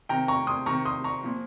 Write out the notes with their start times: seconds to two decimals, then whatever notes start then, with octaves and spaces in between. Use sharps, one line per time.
0.09 C3 D#3 G5 A#5
0.28 A#5 C#6
0.47 C6 D#6
0.66 C3 D#3 A#5 C#6
0.85 C6 D#6
1.04 A#5 C#6
1.23 A#2 F3